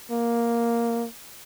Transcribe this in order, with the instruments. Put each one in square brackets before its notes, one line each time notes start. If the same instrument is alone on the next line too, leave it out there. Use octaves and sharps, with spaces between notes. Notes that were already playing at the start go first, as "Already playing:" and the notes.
[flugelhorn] A#3